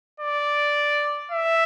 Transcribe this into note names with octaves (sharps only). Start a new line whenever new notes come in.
D5
E5